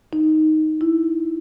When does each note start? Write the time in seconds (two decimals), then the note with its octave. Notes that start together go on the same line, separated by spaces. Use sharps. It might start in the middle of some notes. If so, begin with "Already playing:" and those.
0.13 D#4
0.81 E4